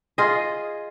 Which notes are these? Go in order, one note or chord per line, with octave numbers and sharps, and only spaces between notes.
F4 G#4 D#5